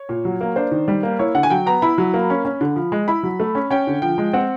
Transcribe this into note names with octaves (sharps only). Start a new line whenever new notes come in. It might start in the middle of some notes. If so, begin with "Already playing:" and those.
Already playing: C#5
A#2
F#3
A#3
D4 C5
D#3
G3
A#3
E4 C#5
D3 F#5
G#5
F#3 G5
B3 A#5
E4 B5
F#3
A#3
C#4
C#4
D3
F3
G#3
E4 B5
F#3
A3
C#4
C#4 G5
D3
F3 G5
G#3
C4 F#5